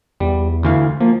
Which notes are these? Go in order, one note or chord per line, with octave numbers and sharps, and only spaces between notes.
E2 G3
D2 E3 F5
F3 A#3